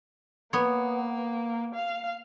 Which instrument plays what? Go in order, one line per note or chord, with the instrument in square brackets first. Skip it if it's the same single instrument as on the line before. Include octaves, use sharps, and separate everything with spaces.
[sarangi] A#3 [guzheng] B3 C#5
[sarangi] F5